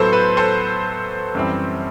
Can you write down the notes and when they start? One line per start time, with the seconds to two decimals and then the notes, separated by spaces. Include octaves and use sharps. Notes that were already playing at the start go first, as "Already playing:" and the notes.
Already playing: A2 F#3 B3 A4 C5
0.13 B4
0.37 A4 C5
1.35 F#2 E3 G3 C4